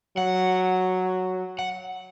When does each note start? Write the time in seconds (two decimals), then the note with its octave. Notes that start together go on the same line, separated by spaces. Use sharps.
0.17 F#3 F#5
1.59 F#5